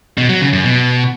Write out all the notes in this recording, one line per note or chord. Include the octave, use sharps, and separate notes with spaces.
B2
F#3
C#3
F#2
B2